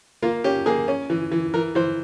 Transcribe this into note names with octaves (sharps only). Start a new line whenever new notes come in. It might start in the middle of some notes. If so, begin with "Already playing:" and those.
A#3 F4
C#4 G4
A#3 G#4
C#4
E3
E3
E3 A#4
E3 C5